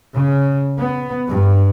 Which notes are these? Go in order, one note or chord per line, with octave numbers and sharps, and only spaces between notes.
C#3
B3
G2